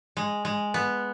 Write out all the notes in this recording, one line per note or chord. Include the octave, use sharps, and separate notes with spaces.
G#3
G#3
B3